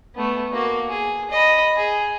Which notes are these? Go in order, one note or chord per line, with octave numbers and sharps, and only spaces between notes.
A3 B3
A#3 F#4
G#4
D#5 B5
G#4